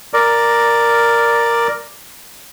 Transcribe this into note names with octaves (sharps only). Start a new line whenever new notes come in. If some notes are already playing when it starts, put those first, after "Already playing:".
A#4 D5